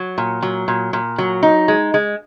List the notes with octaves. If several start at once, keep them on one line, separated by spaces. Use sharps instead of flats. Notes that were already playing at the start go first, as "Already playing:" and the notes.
Already playing: F#3
A#2
F#3
A#2
A#2
F#3
D#4
G#3
G#3